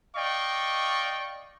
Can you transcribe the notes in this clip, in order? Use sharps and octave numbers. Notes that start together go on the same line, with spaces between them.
D5 D#5 F5 G5 C#6